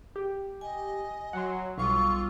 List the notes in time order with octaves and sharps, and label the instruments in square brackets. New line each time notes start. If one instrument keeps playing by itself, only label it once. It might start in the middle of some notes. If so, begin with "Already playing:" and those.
[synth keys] G4
[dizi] D#5 [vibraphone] G#5
[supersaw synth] F#3 [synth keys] F#5 C6
[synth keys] B1 [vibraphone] G3 D6 E6 [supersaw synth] F4 [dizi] C#6